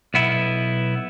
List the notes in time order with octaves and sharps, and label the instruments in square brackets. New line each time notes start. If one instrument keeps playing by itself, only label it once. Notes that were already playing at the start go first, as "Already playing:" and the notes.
[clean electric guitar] B1 B3 E4